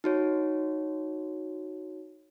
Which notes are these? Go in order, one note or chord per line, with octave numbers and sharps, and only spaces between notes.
D#4 F#4 C#5